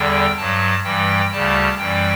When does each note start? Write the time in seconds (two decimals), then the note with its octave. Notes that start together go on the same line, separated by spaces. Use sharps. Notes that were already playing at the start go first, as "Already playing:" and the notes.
Already playing: E2 D3 G3 G5
0.37 G2 F#3 A5
0.83 G2 E3 G3 G5
1.32 D2 C#3 G3 A5
1.78 F#2 E3 G3 G5